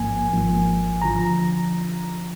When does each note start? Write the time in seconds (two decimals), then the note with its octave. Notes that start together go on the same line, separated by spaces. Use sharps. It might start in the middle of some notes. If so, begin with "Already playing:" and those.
Already playing: G#1 G#2 F3 A#3 G#5
0.30 G#1 G#2 F3 A#3
1.02 D3 F3 A#5